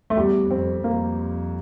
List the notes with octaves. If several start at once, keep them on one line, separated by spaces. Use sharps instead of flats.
A3
E2 G3
F2 C4
F2 A#3